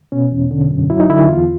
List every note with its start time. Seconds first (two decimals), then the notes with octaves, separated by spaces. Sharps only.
0.12 B2 C#4
0.32 E2
0.51 D3
0.70 F#2
0.90 F#3 E4
1.00 D#4
1.09 D3 E4
1.28 E2 F4